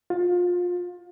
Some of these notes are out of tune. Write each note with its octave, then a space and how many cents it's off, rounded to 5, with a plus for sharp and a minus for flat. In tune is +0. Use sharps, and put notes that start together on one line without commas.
F4 +25